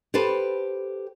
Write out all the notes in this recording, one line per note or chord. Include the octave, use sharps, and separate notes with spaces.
G4 A4 B4 C5 A5